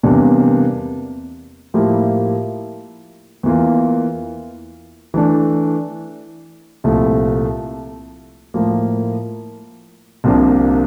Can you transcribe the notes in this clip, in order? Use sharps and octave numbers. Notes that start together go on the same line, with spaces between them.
E2 C3 G3 A#3 D4
A2 F3 A#3 E4 G4
E2 E3 A#3 F4
E3 A3 D4
C2 A#2 F3 A3 E4
A2 F3 A#3
C2 C3 F3 A#3 D4